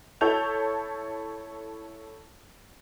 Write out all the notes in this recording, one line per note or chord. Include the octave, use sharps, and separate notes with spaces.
E4 A4 C#5 A5 G6 F7